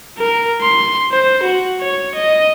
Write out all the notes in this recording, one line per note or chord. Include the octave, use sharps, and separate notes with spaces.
A#4
C6
C5
F#4
C#5
D#5